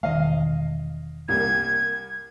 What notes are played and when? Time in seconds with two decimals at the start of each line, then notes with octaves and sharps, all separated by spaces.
0.03 E1 D#3 A3 D#5 F5
1.28 C2 G3 A#3 G#6